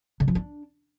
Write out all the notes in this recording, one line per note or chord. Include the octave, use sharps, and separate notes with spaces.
D3
F3
D4